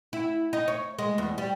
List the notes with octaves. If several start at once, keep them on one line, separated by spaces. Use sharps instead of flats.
E4
D#4
C#5
G#3
E2
G3